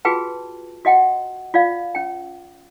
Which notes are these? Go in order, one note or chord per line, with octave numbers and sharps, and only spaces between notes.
F4 F#4 G#4 B4 G5 A5
F#4 D#5 F#5 G5
F4 D5 F5
C#4 G5